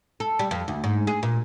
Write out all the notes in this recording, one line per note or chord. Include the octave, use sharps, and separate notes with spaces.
A4
G3
F2
D2
G#2
G#4
A#2